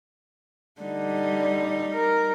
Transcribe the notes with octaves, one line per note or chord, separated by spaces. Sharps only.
D3 G3 D#4
A#4